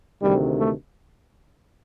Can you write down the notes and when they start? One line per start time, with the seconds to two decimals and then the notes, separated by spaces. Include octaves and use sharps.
0.22 D2 C3 D#3 G3
0.59 A3